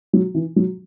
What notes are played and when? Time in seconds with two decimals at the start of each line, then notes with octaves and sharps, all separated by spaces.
0.13 F#3
0.34 E3
0.56 F#3